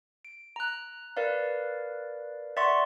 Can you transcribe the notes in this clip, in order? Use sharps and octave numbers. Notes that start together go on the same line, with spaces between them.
D7
A#5 F#6
A#4 B4 D5 F5
D5 E5 F#5 C6 C#6